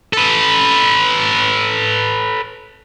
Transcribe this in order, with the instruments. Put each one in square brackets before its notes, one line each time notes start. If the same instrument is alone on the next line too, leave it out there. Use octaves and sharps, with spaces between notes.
[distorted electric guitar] A4 B4